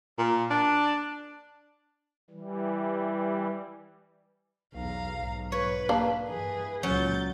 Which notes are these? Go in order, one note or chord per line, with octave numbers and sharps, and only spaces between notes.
A#2
D4
E3 G3
B1 E2 F5 A#5
B1 G#2
B4 C#5
A#3 D4
G2 E3 G#4 B4
C#2 A#2 F#3 C#4 G6 A6